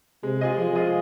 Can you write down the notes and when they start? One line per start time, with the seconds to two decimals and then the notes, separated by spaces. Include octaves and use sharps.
0.23 C3 G#3
0.41 F4 G#4 D#5
0.58 F3 G#3
0.76 F4 G#4 D#5